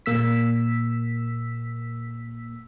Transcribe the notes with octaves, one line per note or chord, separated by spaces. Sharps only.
A#2 A#3 E6 B6